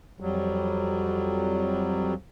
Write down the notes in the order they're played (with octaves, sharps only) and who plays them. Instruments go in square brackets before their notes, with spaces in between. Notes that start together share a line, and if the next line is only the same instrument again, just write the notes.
[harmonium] F2 F#3 G3